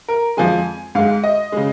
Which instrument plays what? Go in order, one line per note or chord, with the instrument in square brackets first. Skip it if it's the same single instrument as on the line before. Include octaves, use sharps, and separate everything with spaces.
[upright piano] A#4
F2 F3 G#3 G#5
G#2 G#3 F5
D#5
C#3 G#3